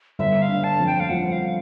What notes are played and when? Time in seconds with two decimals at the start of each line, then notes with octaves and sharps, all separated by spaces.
0.19 G1 E5
0.42 F5
0.49 D3
0.64 A5
0.80 F2
0.87 G5
1.00 F5
1.09 F3 F#5
1.32 F5